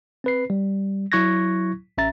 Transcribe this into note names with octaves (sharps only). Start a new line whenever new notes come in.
C4 B4 C7
G3
F#3 E4 C#6 F#6 G#6 A#6
A1 C#4 E5 A#5 A6